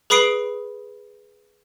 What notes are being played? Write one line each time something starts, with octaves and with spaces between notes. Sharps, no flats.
G#4 B4 B5 D#6 C7 D7